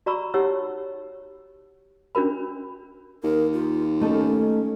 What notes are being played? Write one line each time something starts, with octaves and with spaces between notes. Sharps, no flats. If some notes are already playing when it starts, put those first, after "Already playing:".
F#4 D5 A#5 B5 C#6 E6
D#4 G4 C#5 F#5 E6
C#4 D4 F#4 A#4 B5
D#2 A#4
F4
A3 C#4 D#4 A4